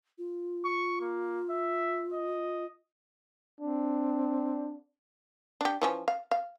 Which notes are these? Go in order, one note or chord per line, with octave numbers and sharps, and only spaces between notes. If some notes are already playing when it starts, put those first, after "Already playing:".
F4
C#6
A#3
E5
D#5
C4 D4
D4 G4
E3 F3 C#4
F5
F5